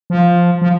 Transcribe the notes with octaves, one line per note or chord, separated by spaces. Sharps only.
F3
F3